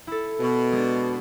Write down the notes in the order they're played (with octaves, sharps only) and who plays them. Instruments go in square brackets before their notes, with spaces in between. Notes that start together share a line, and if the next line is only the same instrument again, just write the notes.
[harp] E4 A4
[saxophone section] B2
[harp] G#3 D4